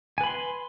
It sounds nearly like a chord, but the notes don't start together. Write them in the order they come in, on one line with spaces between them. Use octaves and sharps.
G#5 B4 B5 C6